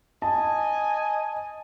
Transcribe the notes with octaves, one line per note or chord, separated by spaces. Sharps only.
D#5 G#5 A5